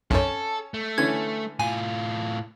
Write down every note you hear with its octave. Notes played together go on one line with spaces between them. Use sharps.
B1 F#2 C#4 A4 C#5
A3
D3 E3 C#4 G#6
A2 F4 G#5